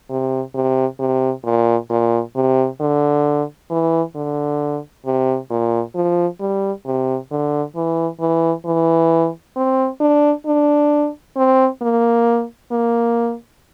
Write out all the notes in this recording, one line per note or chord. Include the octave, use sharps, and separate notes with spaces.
C3
C3
C3
A#2
A#2
C3
D3
E3
D3
C3
A#2
F3
G3
C3
D3
E3
E3
E3
C4
D4
D4
C4
A#3
A#3